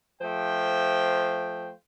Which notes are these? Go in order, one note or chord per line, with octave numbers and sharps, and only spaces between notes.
F3 A3 C5 G5